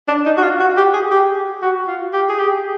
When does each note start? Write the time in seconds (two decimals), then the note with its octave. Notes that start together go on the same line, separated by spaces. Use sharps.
0.08 D4
0.26 D#4
0.37 F#4
0.43 F4
0.60 F#4
0.77 G4
0.94 G#4
1.11 G4
1.62 F#4
1.87 F4
2.13 G4
2.29 G#4
2.40 G4